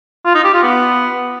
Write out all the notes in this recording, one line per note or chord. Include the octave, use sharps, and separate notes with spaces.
F4
D#4
G4
F4
B3